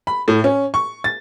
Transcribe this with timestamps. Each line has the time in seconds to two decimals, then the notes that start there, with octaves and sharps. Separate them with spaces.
0.07 B5
0.28 A2
0.44 C#4
0.74 C#6
1.04 A6